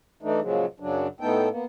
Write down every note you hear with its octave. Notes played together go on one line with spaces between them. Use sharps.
E3 A3 D4 D#4
A#2 C#3 F3 F#3 G#3
F#2 C#3 F#3 D4
A2 A3 B3 D#4 A4 G5
A#3 B3